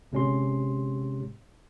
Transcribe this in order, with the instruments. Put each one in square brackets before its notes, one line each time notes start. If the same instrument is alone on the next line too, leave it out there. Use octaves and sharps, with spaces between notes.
[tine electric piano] G1 C3 G#3 C#4 G4 C6